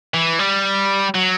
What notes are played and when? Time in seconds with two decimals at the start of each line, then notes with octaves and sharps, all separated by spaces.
0.14 E3
0.39 G3
1.15 F#3